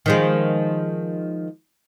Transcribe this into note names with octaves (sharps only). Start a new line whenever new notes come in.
D#3 F3 G#3